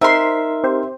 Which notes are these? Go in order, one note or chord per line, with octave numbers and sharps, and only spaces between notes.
C4 D#4 A#4 E5 C6 B6
C4 G4 C5